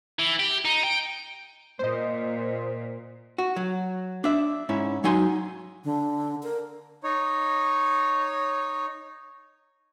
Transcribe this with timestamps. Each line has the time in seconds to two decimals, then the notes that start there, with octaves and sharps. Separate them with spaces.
0.19 E3
0.40 G4
0.65 D#4
0.83 G5
1.79 A#2 C5 D#5
3.38 F#4
3.56 F#3
4.24 D4 E5
4.69 G#2 C#4 E4
5.04 F#3 D#4 G#5 C6
5.85 D3
6.43 A#4
7.03 D#4 C#5